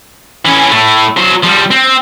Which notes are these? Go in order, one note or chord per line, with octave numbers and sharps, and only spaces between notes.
E3 C#4
A2 A3
F#3 C5
F3 G3
C4